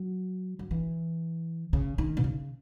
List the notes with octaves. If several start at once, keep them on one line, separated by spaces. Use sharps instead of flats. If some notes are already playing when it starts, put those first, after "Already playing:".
Already playing: F#3
F#3
E3
C#3
D#3
B2
C#3